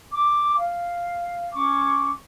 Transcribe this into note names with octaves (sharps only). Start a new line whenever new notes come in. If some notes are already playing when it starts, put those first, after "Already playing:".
D6
F5
C#4 C#6 D6